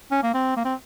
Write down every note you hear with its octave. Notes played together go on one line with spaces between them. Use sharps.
C#4
A#3
C4
A#3
C4